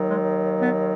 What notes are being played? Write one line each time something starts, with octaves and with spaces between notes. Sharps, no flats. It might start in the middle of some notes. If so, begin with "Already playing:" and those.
Already playing: D#2 D#3 F#3
G#3
B3